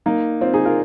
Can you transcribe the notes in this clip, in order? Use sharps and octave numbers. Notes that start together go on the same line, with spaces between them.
A#3 D#4
C4 F4
D#4 G#4
F4 A#4